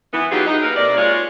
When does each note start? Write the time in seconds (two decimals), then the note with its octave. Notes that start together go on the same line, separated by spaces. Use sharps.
0.13 E3 B3
0.31 F#3 D#4 F4 G4 G#4 B4
0.47 D#4
0.62 A#3 A#4 B4
0.76 C3 A#3 A#4 D5
0.97 G#3 F4 C#5